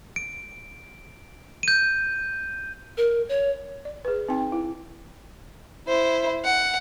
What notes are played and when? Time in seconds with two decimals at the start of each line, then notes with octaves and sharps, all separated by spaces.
0.16 D7
1.63 G6 D#7
2.97 A#4
3.29 C#5
3.85 D5
4.05 G#4 B4
4.28 C4 D#4 G5
4.52 E4
5.88 E4 C5
6.45 F#5